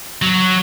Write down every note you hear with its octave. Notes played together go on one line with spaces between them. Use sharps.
F#3